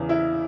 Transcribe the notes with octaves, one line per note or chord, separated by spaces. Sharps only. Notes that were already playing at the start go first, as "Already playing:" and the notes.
Already playing: E2 C#3 E3
E4 E5